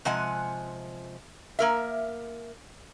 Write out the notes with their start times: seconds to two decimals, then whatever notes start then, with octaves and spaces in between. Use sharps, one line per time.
0.05 C3 F3 G#3 F#5 G#5
1.59 A#3 A#4 E5